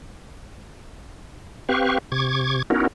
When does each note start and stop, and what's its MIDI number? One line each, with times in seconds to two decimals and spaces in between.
1.69 1.98 60
1.69 1.98 67
1.69 1.98 71
1.69 1.98 77
1.69 1.98 85
2.12 2.62 48
2.12 2.62 85
2.12 2.62 86
2.12 2.62 92
2.70 2.87 59
2.70 2.87 61
2.70 2.87 63
2.70 2.87 64
2.70 2.87 66
2.70 2.87 70